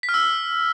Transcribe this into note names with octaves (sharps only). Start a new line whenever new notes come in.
B6
F6
E6